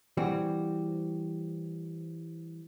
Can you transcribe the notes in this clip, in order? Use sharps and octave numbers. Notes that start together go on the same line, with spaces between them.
E3 G3 C4 F#4